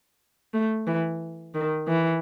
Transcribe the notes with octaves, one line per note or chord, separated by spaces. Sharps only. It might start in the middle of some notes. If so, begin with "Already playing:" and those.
A3
E3
D#3
E3